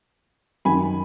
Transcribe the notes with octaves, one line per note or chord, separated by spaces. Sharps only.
F#2 D#3 F#3 G#5 B5